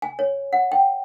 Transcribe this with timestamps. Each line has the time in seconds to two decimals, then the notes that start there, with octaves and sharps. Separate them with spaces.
0.02 G#5
0.19 C#5
0.53 F#5
0.72 G5